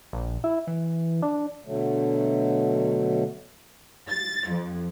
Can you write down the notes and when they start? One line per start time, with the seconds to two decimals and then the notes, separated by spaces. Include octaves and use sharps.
0.13 A#1
0.44 E4
0.67 E3
1.22 D4
1.65 B2 D3 F#3 A3
4.09 A6
4.51 F2